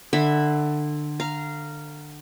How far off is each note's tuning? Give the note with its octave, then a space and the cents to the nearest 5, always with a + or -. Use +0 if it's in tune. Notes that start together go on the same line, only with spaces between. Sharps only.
D3 +25 E5 +0 B5 +0
F5 -15 A#5 +0